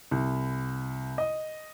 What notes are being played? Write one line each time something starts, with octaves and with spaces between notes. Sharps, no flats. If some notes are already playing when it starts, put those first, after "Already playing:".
C2
D#5